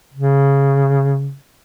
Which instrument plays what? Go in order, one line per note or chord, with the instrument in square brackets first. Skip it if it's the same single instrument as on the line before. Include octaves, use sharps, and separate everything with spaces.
[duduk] C#3